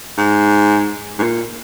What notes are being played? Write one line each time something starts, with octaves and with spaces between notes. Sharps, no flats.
G#2
G#2
A#2